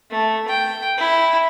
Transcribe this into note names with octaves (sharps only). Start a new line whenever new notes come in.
A3
G5
E4